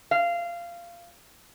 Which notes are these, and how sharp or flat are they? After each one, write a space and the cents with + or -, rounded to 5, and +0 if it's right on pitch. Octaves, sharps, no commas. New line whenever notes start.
F5 -20